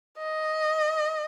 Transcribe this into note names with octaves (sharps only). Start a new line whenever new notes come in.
D#5